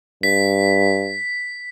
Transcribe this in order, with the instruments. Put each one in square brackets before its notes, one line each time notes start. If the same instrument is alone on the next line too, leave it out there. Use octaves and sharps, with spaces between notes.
[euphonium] G2 [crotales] B6